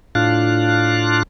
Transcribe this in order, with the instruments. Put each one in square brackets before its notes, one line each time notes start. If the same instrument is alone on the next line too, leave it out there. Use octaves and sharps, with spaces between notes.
[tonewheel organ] A2 D4 F4 F5 F#6